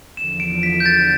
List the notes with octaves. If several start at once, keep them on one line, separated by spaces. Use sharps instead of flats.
E2 D3 F3 E7
D7
B6
G6
A6